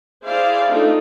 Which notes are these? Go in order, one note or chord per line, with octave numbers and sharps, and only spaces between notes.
E4 G#4 C5 D5 F5
A3 C4 D4 D#4 F4 A4